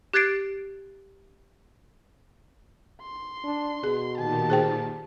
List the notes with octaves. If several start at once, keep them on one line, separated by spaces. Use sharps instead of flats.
G4 F#6 G#6 A6 C7 D7
C6
D4
B2 G#4
A#2 D#3 G4 A5
G#4 C5 G5